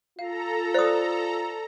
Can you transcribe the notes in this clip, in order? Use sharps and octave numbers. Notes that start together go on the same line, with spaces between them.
F4 A4 F5 A#5
C5 D5 D#6